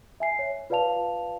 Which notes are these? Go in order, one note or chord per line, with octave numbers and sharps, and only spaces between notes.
E5 G#5 C7
C#5
F4 B4 D5 F5 A5 F7